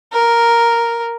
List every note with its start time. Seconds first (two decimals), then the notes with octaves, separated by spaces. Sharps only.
0.13 A#4